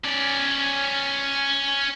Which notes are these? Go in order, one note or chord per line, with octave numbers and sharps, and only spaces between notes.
C#4 D5